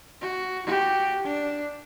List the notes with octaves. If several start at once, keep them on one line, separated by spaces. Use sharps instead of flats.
F#4
F#4 G4
D4